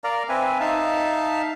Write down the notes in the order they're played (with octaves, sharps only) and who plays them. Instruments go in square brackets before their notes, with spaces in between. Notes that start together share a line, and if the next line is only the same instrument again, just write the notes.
[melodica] A#4 D5 F5 A#5
C4 B4 E5 G#5
D#4 E5 F5 A5